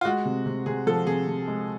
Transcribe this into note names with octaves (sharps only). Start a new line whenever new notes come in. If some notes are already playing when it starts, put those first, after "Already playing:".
F4
G#3 F#4
C3
C3
C3 G#4
F3 A4
C3 G#4
C3
G#3